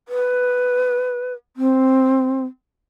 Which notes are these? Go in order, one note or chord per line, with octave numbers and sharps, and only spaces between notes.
B4
C4